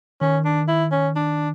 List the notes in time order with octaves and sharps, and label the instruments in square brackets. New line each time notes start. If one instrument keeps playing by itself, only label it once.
[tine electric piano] D#3 [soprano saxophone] C#4
[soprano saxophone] D4
E4
C#4
D4